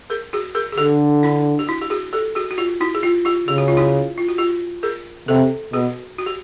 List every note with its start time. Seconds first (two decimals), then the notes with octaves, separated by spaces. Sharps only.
0.10 G#4 A#4
0.33 F#4 G#4
0.55 G#4 A#4
0.72 G#4
0.78 D3 G4 A4
1.23 D4 E4
1.59 G4
1.67 E4 F#4
1.82 G4
1.90 F#4 G#4
2.13 G4 A4
2.35 F#4 G#4
2.51 F#4
2.58 F4 G4
2.81 E4 F#4
2.95 G#4
3.03 F4 G4
3.25 F4 G4
3.48 C#3 G4
3.58 F#4
3.68 F4
3.77 E4 F#4
4.18 F4
4.28 F#4
4.38 F4 G4
4.83 G#4 A#4
5.28 C3 G4 A4
5.73 B2 F#4 G#4
6.18 F#4
6.26 G4